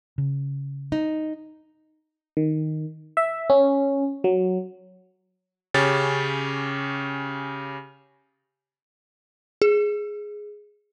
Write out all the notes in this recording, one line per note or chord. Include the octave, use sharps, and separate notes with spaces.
C#3
D#4
D#3
E5
C#4
F#3
C#3 C#4 G4 A6
G#4